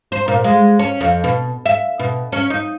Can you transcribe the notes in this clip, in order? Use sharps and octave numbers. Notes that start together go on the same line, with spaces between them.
C5
A#2
G#3
C#4
F2
B2
E5
B2
C#4
D#4